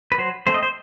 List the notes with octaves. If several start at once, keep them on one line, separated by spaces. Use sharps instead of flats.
B4
F#3 C5
A3 C4 C5
D#5
C5